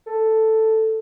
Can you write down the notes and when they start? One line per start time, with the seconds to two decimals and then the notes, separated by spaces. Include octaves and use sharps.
0.07 A4